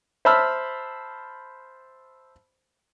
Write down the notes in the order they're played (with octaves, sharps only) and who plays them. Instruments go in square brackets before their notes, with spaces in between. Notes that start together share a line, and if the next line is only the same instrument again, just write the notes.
[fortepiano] C5 E5 A5 B5 E6 F6